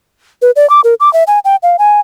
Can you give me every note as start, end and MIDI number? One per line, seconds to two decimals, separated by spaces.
0.42 0.51 71
0.56 0.69 74
0.70 0.81 86
0.84 0.94 70
1.00 1.12 86
1.13 1.24 76
1.27 1.39 80
1.45 1.56 79
1.63 1.77 77
1.79 2.00 80